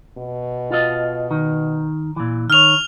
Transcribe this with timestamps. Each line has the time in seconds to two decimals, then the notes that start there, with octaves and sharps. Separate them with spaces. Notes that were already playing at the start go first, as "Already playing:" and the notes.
0.17 B2
0.71 F4 A4 D#5
1.31 D#3
2.16 A#2 E3
2.50 D#3 C#5 F6 F7